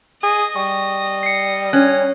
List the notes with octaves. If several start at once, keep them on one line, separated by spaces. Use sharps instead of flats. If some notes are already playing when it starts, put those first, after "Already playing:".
G#4 D#5
G3 C#6
C7 C#7
C#4 C#5 F#6